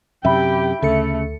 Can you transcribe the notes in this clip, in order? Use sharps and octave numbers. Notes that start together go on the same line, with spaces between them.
F#2 C3 G4 E5 G5 B5
D2 C#3 A3 A4 C#7